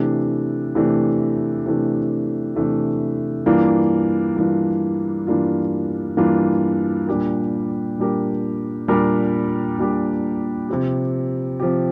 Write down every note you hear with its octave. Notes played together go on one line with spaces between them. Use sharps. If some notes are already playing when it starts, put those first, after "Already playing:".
Already playing: C3 E3 A3 D4
C3 E3 A3 D4
C3 E3 A3 D4
C3 E3 A3 D4
G2 E3 A#3 D4 F4
G2 E3 A#3 D4 F4
G2 E3 A#3 D4 F4
G2 E3 A#3 D4 F4
A#2 G3 D4 G4 A#4
A#2 G3 D4 G4 A#4
A#2 G3 D4 G4 A#4
A#2 G3 D4 G4 A#4
C3 F3 C4 G4
C3 F3 C4 G4